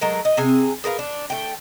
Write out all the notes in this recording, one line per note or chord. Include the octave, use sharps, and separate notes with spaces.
F#3 G#3 A3 A#4
D#5
C3 C4 G#4 G#5
G#4 A#4 B4 F5
D4
A3 G5